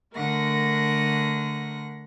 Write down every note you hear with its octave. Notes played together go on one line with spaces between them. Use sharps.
D3 A3 A#4 F#5 A#6